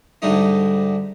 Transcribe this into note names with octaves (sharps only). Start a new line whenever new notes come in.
D2 G#2 D3 G3 A3 D#4